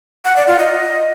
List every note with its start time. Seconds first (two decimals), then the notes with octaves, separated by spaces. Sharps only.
0.25 F#5
0.36 D5
0.47 F4
0.59 D#5